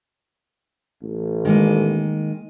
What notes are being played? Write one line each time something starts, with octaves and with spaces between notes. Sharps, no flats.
A1
D#3 G#3 A#3